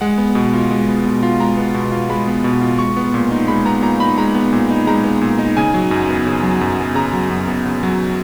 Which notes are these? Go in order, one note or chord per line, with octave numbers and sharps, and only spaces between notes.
G#3 F#5
B3
B2
F4
G#3
B3
B2
F4
G#3 A#5
B3
B2
F4
G#3 B5
B3
B2
F4
G#3 C#6
B3
A#2
D#4
G#3 B5
B3 A#5
A#2 A#5
D#4 B5
G#3 A#5
B3
A#2
D#4
G#3 A#5
B3
A#2
D#4
C#3 G#5
F#3
F#2
B3
C#3
F#3
F#2
B3
C#3 A#5
F#3
F#2
B3
C#3
F#3